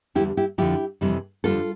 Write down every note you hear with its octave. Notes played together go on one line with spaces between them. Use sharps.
E2 D3 G3 E4 G4
E4 G4
F2 D3 F3 E4 G4
F2 C3 E3 G3
F2 D3 G3 F4 A4